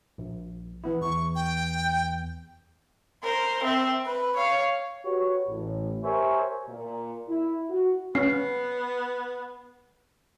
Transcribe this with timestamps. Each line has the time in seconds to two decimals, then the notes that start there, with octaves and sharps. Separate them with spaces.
0.18 A#1
0.84 E3 B3 E4
1.02 E2 C#6
1.35 G5
3.24 A#4 C5
3.64 C4 E5
4.06 B4
4.36 C#5 F5
5.04 F#4 G4 B4 C#5
5.49 A1 A2
6.04 G4 A#4 C5 C#5 E5 G#5
6.67 A#2
7.28 E4
7.69 F#4
8.15 B3 C#4 C7